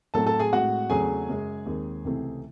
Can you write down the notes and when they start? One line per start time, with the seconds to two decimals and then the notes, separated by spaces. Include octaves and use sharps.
0.14 A2 F#3 A3 C4 A4 A5
0.27 A4 A5
0.39 G#4 G#5
0.52 A2 G#3 C4 F#4 F#5
0.90 E2 C#3 F#3 A3 C4 G#4 G#5
1.28 F#2 C#3 G#3
1.66 D#2 D#3 G#3 C4
2.04 C#2 C3 E3 A3 C4